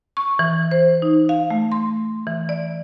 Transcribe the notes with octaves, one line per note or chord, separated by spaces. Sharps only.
C#6
E3
C5
D#4
F5
A3
C6
E3
D5